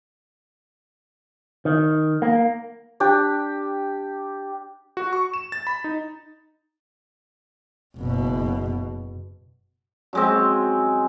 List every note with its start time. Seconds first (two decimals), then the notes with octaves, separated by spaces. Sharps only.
1.65 D#3
2.22 A#3
3.00 D4 G4
4.97 F#4
5.13 C#6
5.34 E7
5.52 A6
5.67 B5
5.84 D#4
7.98 F#1 B2
10.13 F#2 G#3 C4